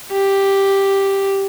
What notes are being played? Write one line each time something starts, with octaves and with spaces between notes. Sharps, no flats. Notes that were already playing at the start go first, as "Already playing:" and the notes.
G4